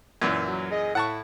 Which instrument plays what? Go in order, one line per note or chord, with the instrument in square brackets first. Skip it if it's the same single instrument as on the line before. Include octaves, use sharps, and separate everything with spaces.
[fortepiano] F#2 A#2 E3
[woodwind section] F#3
G#4 D#5
[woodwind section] A2 E4 [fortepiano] F#5 A5 C#6